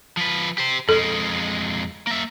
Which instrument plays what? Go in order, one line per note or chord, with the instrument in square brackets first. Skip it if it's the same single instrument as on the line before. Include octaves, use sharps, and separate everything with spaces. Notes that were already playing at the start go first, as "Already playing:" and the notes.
[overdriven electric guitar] F3 B4
G4 C5
[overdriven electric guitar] F2 G#3 [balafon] A4
[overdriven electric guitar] A#3 E5